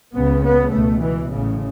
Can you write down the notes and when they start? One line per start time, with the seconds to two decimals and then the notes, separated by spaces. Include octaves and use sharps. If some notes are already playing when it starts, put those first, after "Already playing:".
0.13 C#2 C#3 B3
0.43 B3
0.72 C#2 B2 A3
1.02 E3
1.32 A1 A2 C#3